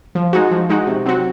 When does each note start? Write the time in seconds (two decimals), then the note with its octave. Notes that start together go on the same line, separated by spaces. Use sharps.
0.15 F3
0.33 G#3 D#4 F#4
0.51 F3
0.69 G#3 D#4 F#4
0.87 C3
1.06 F#3 C4 F#4